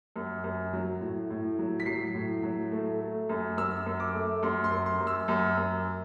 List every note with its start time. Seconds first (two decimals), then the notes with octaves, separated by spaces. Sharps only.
0.16 F#2
0.44 F#2
0.73 F#3
1.01 A2
1.30 A2
1.59 F#3
1.80 B6
1.86 F#3 C7
2.14 A2
2.43 F#3
2.72 A3
3.01 A3
3.29 F#2
3.57 F#2 E6
3.86 F#2
4.00 D6
4.14 A3
4.43 F#2 C6
4.64 C6
4.71 F#2
4.86 C6
5.00 F#2
5.07 E6
5.28 F#2
5.57 F#2